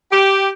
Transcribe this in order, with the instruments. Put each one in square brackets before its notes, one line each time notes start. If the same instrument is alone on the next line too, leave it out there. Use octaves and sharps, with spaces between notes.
[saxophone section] G4